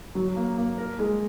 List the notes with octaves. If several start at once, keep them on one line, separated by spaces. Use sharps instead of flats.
F#3
A#3
A#3
A#4
G#3